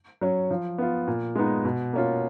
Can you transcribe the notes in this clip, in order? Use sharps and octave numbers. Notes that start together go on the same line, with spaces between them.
F#3 C#4
F3
B3 F4
A#2
G#3 B3 D#4
B2
A#3 C#4 F4